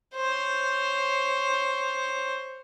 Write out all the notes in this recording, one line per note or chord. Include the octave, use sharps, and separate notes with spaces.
C5 C#5